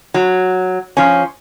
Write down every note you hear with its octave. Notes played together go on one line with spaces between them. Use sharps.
F#3
F3 C#4